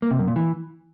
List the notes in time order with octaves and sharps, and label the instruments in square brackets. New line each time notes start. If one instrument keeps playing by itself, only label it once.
[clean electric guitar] A#3
C3
F#2
A#2
E3